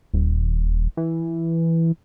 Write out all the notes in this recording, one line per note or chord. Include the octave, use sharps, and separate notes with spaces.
D#1
E3